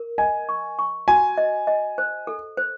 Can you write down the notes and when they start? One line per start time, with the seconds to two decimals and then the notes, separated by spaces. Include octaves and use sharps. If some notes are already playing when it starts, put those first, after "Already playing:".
Already playing: A#4
0.18 D#5 G#5
0.49 C#6
0.79 C#6
1.08 F#4 G#5
1.38 D#5
1.67 D#5
1.98 C5
2.27 A4
2.57 C5